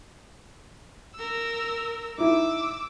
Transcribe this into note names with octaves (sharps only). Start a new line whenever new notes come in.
A#4 E6
D#4 E4 D6 E6